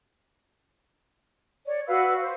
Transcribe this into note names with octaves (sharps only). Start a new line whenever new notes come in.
C#5 D5
F#4 B4 F5 E6
C5